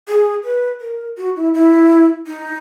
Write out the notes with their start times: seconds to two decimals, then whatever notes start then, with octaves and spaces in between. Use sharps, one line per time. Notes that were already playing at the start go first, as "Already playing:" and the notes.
0.08 G#4
0.44 B4
0.81 A#4
1.18 F#4
1.36 E4
1.54 E4
2.27 D#4